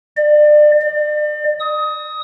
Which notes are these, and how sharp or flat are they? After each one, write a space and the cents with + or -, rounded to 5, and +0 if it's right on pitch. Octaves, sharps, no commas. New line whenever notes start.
D5 +30
D5 +35
D#6 +20